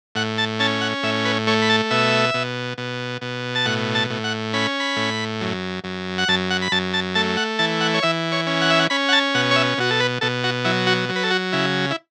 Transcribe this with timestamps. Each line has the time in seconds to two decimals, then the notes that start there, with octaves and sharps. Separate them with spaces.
0.15 A2 F#5
0.38 A5
0.60 C#4 A5
0.81 F#5
1.03 A2 E5
1.25 B4
1.47 A3 C#5
1.62 B5
1.70 A5
1.91 B2 E5
2.34 B2
2.78 B2
3.22 B2
3.55 A5
3.65 A2 F#5
3.95 A5
4.10 A2
4.24 F#5
4.53 C#4 B5
4.80 B5
4.97 A2
5.41 F#2
5.84 F#2
6.18 F#5
6.28 F#2 A5
6.51 F#5
6.62 B5
6.72 F#2 A5
6.94 A5
7.15 A3 A5
7.37 F#5
7.59 E3 A5
7.81 F#5
7.94 C#5
8.03 E3 E5
8.32 C#5
8.47 C#4
8.61 F#5
8.70 E5
8.79 F#5
8.90 C#4 B5
9.09 F#5
9.13 A5
9.35 B2 F#5
9.51 C#5
9.56 E5
9.78 B2 F#4
9.91 A4
10.00 B4
10.21 B2 A4
10.44 F#4
10.65 F#3 E4
10.87 F#4
11.09 F#3
11.16 B4
11.23 A4
11.31 F#4
11.52 C#3 E4
11.91 E4